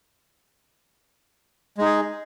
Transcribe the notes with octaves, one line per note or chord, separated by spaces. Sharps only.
G#3 D#4 G#4